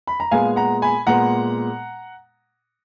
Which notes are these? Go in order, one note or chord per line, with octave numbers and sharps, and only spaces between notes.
B5
A#5
A#2 G#3 B3 F5 G#5
F#5 A#5
G#5 B5
A#2 G#3 B3 F#5 A#5